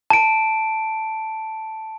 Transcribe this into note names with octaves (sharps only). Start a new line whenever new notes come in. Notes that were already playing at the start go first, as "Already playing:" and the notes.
A5 D7